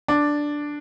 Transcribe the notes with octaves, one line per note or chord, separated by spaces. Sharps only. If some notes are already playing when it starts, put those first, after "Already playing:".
D4